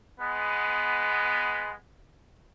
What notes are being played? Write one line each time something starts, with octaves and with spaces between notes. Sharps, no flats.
G#3 B3